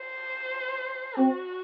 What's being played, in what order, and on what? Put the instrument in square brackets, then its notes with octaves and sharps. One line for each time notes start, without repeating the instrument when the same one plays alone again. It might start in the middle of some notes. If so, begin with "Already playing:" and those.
Already playing: [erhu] C5
[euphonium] C4 [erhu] F#4